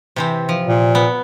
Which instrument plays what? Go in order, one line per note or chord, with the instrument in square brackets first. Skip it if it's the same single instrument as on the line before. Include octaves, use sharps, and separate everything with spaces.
[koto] C3 E3 C4
F3
[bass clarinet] A#2
[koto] B3